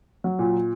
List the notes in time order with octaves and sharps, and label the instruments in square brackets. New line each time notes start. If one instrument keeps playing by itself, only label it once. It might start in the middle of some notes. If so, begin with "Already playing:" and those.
[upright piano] F#3
A#2